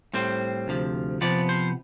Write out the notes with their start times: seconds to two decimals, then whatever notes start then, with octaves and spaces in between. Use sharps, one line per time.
0.14 A2 G3 C4 C5
0.68 D2 C3 F3
1.21 C3 F3 B3 D5
1.49 C5